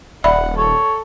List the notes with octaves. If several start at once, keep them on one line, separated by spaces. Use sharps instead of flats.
D#1 D5 E5 F#5 B5
A4 C#5